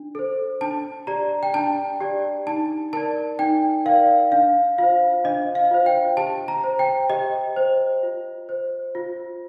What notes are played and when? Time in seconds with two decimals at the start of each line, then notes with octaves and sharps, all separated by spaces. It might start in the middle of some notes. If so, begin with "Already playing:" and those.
Already playing: D4
0.15 A4 C5
0.61 D4 A5
1.07 G4 D5 A#5
1.43 G5
1.54 D4 A5
2.01 G4 D5
2.47 D#4 A5
2.93 A#4 D5 A5
3.39 D#4 G5
3.86 A#4 D5 F5
4.32 D4 F5
4.78 F4 C5 F5
5.24 D4 D#5
5.55 F5
5.71 F4 C5
5.86 G5
6.17 G4 A5
6.48 A#5
6.64 C5
6.79 G5
7.09 G4 D#5
7.56 C5
8.03 F4
8.49 C5
8.95 F4